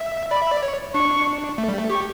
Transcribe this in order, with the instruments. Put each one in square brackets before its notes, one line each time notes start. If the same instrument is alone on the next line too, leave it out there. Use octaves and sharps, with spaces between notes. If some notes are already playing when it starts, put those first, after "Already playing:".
Already playing: [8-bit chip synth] E5
[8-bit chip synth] D5 [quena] B5
[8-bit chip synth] E5
D5
C#5
[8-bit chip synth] D4 [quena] C#6
[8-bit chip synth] A3
G3
A3
[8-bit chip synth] G4 [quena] C#6